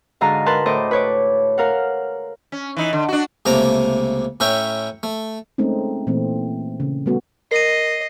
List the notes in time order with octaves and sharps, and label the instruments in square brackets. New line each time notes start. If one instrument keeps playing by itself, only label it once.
[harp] G#2 D3 F#4 D#5 F5 A#5
A#4 B4 A5 C6 F#6
A2 C5 D#5 D6
B4 C#5 D6
A#4 F5 F#5
[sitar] C#4
E3 D#4
D3
D4 F#4
[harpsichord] C#2 C3 A3 A#3 A#5 D6
A2 C#4 A#4 E5 G5 C#6
A3
[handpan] G#3 A3 C4 C#4 D#4
A#2 E3 A3 C4
C#3
G3 A3 B3 F#4
[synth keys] A#4 [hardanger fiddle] D#5 [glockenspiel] C7 D#7